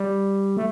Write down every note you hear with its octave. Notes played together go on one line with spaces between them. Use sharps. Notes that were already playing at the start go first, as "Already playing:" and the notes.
Already playing: G3
A3